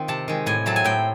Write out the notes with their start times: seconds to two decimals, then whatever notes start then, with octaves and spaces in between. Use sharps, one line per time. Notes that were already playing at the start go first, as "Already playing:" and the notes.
Already playing: D#3 C4 F4
0.08 C3 A5
0.28 D#3 G#3
0.46 A2 G#5
0.66 F#3 A3 C4 A5
0.76 G#5
0.84 A2 G5